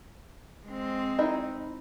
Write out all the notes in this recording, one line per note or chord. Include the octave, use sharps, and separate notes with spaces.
G#3 C4
D#4 E4 D#5